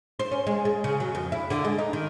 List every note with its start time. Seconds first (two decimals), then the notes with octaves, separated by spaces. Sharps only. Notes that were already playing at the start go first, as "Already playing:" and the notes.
0.19 C5
0.32 C#4
0.47 G#3
0.65 G#3
0.84 C#3
1.00 F#3
1.15 F2
1.32 E4
1.50 D3
1.65 G#3
1.79 D#4
1.93 D#3